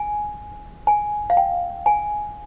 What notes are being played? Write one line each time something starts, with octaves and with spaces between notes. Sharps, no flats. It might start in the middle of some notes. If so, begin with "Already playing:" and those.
Already playing: G#5
G#5
F5
G5
G#5